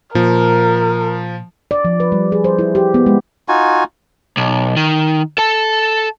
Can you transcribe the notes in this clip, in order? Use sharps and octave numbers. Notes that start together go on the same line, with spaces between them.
A#2 F3 A#4
D5
F3
B4
G3
G#4
C5
E4
G4
B3
G#3
D#4 F4 F#4 G#5
B1
D#3
A4 A5